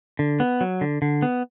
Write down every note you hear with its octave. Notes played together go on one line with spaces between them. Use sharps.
D3
B3
F#3
D3
D3
B3